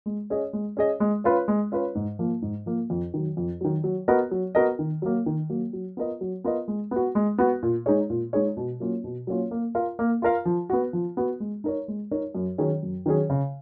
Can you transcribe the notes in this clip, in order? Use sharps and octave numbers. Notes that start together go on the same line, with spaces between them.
G#3
C#4 G#4 D#5
G#3
C#4 G#4 D#5
G#3
C#4 F4 B4
G#3
C#4 F4 B4
G#2
F3 A#3
G#2
F3 A#3
F2
D#3 F#3
F2
D#3 F#3
F#3
B3 F#4 A#4 D#5
F#3
B3 F#4 A#4 D#5
D#3
F#3 A#3
D#3
F#3 A#3
F#3
B3 F4 A#4 D#5
F#3
B3 F4 A#4 D#5
G#3
B3 F#4
G#3
B3 F#4
A#2
G#3 D#4 G#4 C#5
A#2
G#3 D#4 G#4 C#5
B2
F#3 A#3 C#4 F4
B2
F#3 A#3 C#4 F4
A#3
F4 A#4 F5
A#3
F4 A#4 F5
F3
B3 F#4
F3
B3 F#4
G#3
D#4 A#4 C#5
G#3
D#4 A#4 C#5
F#2
D#3 F#3 C#4 G#4
F#2
D#3 F#3 C#4 G#4
C#3